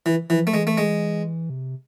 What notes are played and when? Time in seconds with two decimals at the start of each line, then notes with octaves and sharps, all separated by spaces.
0.06 E3
0.30 E3 F3
0.47 A3
0.53 E3 G#3
0.67 A3
0.78 G#3
1.50 C3